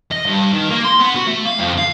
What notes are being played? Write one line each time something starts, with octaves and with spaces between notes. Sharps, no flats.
D#5
G2
D#3
A#3
C6
B3
F#4
A3
F5
F2
F5